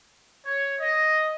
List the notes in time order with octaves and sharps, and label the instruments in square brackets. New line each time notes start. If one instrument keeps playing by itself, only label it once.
[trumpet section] C#5
D#5